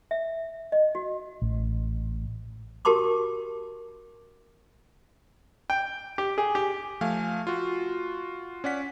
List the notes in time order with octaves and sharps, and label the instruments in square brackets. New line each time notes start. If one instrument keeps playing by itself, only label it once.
[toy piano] E5
D#5
F#4
[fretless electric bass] A1
[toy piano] F#4 G4 A#4 A5 C6 D6
[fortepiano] G5
G4
G#4
G4
[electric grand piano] F3 A3 F5 G#5
F4 F#4
C#4 D5 F#5 B6